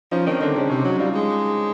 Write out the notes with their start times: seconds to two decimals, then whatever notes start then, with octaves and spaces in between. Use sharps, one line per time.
0.12 F3 C#4 D#4
0.26 D#3 C4 D4
0.41 D3 C4 D4
0.56 C#3 C#4 D#4
0.70 C3 C#4 D#4
0.85 F#3
0.99 G3 D#4 F4
1.14 G#3